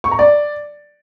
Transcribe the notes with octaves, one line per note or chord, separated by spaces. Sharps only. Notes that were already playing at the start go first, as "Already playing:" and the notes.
C#6
A#5
D5